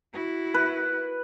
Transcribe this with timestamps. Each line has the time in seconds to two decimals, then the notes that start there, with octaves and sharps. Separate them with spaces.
0.14 E4 F#4
0.54 B4